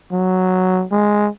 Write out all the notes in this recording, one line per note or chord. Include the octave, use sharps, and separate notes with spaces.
F#3
G#3